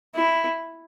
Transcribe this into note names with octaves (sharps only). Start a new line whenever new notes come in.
E4